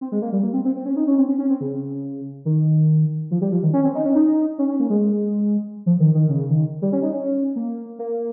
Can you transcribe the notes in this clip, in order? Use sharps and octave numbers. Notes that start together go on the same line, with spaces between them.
C4
G#3
A#3
G3
A#3
C4
C4
C4
C#4
D#4
C#4
C4
C#4
C#4
C4
C#3
D#3
F3
G3
F3
D#3
C#4
C4
D#4
C#4
D#4
C#4
C#4
A#3
G#3
F3
D#3
D#3
C#3
D#3
G3
C#4
D#4
C#4
A#3
A#3